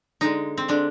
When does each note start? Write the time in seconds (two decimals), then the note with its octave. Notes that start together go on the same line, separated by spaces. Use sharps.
0.21 D3 G#3 D#4
0.58 C4
0.68 D3 G#3 D4